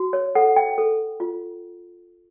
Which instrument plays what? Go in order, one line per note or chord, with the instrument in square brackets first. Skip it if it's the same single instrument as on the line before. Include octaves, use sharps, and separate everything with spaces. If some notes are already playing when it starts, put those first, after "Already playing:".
Already playing: [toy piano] F#4
C#5
A4 F#5
G5
A4
F4